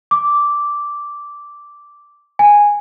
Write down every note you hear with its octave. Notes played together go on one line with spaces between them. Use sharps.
D6
G#5